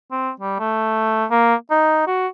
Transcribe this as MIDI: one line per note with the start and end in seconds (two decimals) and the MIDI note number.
0.11 0.31 60
0.40 0.59 55
0.59 1.25 57
1.31 1.55 58
1.71 2.06 63
2.07 2.28 66